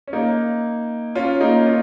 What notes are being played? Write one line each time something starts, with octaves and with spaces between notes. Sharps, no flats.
C#4
A#3 D#4
C#4 F4
A#3 D#4
C#4 F4